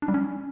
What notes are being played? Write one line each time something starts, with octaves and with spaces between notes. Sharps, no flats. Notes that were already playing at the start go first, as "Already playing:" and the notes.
D4
G3
C#4